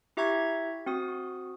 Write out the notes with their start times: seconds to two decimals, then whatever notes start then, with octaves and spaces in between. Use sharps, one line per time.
0.17 E4 G4 E5 A#5 C#6 G#6
0.86 C4 F#4 D#6